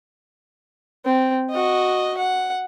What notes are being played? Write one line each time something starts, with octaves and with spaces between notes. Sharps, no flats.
C4
F#4 D#5
F#5